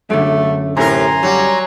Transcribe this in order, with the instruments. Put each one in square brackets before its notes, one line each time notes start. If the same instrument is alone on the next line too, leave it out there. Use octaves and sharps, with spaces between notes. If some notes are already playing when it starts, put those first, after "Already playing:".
[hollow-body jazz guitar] F#2 D3 [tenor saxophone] A3
[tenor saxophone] A2 [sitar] C3 A#4 [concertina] G#5 A#5 C6
[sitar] F#3 [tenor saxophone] G3